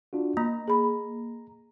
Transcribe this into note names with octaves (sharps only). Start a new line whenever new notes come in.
D4 F4 F#4
A#3 A#5
G#4 B5